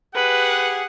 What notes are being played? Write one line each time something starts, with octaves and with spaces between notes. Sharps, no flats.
G4 G#4 B4 F#5